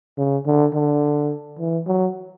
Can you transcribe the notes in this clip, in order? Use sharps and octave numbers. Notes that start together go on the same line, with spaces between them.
C#3
D3
D3
E3
F#3